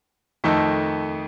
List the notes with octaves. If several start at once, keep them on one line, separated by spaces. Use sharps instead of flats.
F2 D#3 A3 D#4 A4